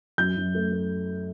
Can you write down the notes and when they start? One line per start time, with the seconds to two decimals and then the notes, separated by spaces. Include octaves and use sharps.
0.18 F#2 G6
0.36 F#2
0.55 A3
0.72 A3